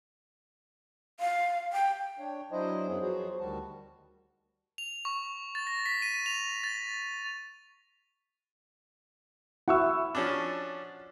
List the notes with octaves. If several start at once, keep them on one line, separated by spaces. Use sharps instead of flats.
F5
G5
D4 C#5 G5
F#3 D4 E4 C5 D#5
F#2 B3 C#4 G#4
F3 F#3 B3 F#4 G#4 C5
D2 D#3 G3 F#4 A5
F7
C#6
A6
A#6
B6
D#7
F7
A6
E4 F#4 F#5 C#6 E6
F3 C#4 D4